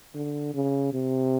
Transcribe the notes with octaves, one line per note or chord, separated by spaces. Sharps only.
D3
C#3
C3